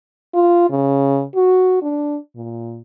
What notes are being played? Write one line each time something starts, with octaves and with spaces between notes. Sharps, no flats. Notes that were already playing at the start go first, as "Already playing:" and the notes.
F4
C#3
F#4
D4
A#2